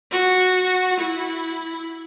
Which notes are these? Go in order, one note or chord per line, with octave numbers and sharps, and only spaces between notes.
F#4
E4